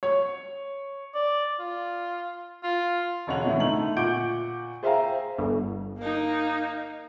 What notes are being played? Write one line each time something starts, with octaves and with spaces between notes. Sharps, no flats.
C#5
D5
F4
F4
E1 C#3 C#5 D#5 F#5 F7
C2 A2 E3
D3 A3 D#4 F#7
A#2 F#5 C#6 D6 G6 D7
G#4 C5 E5 F5 G5 A#5
G1
A#3 D#4